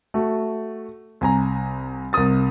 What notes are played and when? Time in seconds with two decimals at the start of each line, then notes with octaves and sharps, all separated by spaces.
0.14 A3 F#4
1.21 C2 G#5 A#5
2.13 C2 C3 A#4 D#6 A6